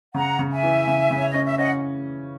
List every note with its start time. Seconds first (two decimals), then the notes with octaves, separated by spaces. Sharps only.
0.14 C#3 F#5 A#5
0.39 C#3
0.51 E5 G#5
0.63 E3
0.87 C#3
1.11 C#3
1.17 C#5
1.31 C#4 D#5
1.45 E5
1.58 C#4 D#5 F#5